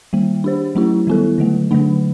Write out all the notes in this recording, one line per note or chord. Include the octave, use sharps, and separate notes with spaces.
D#3 G3 A#3
D4 G4 C5
F#3 A3 C#4 E4 G4
D#3 G3 B3 E4 A4
D3 F#3 A3
D3 F#3 A3 D4